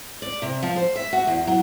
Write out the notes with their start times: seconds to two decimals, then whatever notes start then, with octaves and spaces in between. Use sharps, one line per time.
0.22 D5
0.42 C3
0.63 F3
0.76 C5
0.96 E5
1.13 F#4
1.27 E2
1.47 F#3